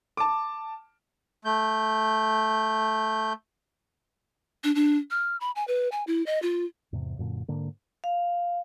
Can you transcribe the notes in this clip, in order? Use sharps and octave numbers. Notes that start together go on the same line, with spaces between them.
A5 D6
A3 G6
D4
D4
F6
B5
G#5
B4
G#5
E4
D#5
F4
E2 G#2 C3
F#2 A#2 D3
G#2 D3 A#3
F5